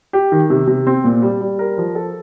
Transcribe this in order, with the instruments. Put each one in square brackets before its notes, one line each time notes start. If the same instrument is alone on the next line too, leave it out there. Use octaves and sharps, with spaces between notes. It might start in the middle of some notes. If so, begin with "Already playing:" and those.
[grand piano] G4
D#3
C3
C3
C4
A#2
G3
G3
A#4
F3
A4